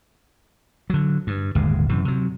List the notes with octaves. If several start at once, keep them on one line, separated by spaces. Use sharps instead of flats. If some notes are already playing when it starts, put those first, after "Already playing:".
D3 F#3
G2
D1 G1 D#2 G#3
F#2 C3 E3
C3 F#3